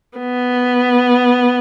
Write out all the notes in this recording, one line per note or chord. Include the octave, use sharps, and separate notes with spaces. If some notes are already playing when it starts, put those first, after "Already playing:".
B3